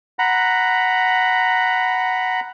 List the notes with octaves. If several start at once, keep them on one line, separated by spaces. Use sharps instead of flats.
F#5 A#5 B5